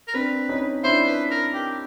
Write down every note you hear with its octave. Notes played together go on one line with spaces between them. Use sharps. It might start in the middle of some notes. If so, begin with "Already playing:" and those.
A#4
C4 D4 B4
C#4 D#4
D4 E4 C5
B4
A#4
G4